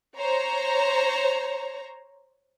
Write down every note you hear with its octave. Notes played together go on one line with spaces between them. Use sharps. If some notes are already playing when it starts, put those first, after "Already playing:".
C5 C#5 A#5